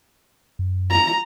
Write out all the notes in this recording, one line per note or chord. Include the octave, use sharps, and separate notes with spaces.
F#2
A#5